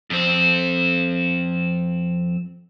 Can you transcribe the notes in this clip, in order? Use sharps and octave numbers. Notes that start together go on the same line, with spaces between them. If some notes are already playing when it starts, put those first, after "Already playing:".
F2 C4